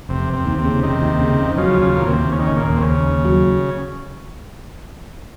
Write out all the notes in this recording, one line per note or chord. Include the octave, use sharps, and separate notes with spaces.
F1 C3
F1
C3
D#2
C3
C#3
F1 C3 D#3
D#2
C#3
F1
D#3
C#3 F3 F#3
D#2
C#3 F3
D#2 A#2
C3
D#2
D#2 C#3
D#3
C#3
D#2
A#2
D#2
C3
C#3
D#2
D#2
F#3